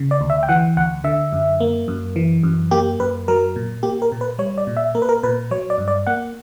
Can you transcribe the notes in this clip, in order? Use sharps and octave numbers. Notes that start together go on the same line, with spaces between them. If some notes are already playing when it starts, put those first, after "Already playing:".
Already playing: C#3
D5
D2
E5
G5
E3 F#5
D2 F#5
D3 E5
F#2
A#3
F#2
E3
F#2
A#3 G4
F#2 B4
F#3 A#4
A#2
A#3 G4
A#4
A#2
B4
G3 C#5
D5
A#2
E5
A#3 A#4
B4
A#4
A#2 B4
F#3 C#5
D5
G2
D5
A#3 F#5